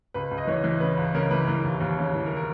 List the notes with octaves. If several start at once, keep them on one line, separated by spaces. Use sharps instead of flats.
C#2 B4
C#2
D#5
E3 C#5
E3
C#3 B4
C#2
C#3 A#4
E3 B4
E3 A#4
D#2
D#2
C#3
E3
A#4
A#4